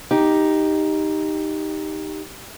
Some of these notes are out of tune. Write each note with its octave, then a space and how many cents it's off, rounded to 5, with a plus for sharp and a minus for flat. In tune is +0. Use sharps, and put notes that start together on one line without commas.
D#4 +0 G4 +0